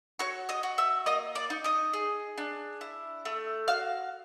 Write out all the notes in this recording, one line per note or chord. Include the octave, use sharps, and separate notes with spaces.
F#4 C#5 C#6
D#5 D#6
F#4
E5 E6
A#3 D#5 D#6
D5 D6
D#4
D#5 D#6
G#4
D4
E4
A3
F#4 F5 F6